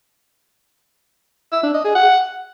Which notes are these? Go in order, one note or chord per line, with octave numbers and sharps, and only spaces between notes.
E5
D4
D#5
G#4
F#5